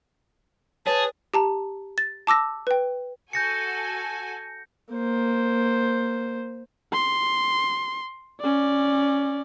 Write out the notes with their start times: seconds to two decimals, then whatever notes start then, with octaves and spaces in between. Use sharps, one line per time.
0.87 G#4 B4 C#5 A5
1.34 G4 A5 A#5
1.98 A6
2.27 A5 D6 E6 A#6
2.67 B4 G5
3.33 F#4 A4 G#5 G6 A#6 C#7
4.93 A#3 C5
6.93 C6
8.41 C#4 D5